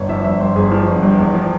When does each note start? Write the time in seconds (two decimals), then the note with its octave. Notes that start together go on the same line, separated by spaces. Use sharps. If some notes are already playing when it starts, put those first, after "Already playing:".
Already playing: G1 C#5
0.09 F3 E5
0.24 G1 E5
0.40 G2 C5
0.56 G1 G#4
0.71 F3
0.88 G1
1.02 G2
1.18 E2
1.34 F3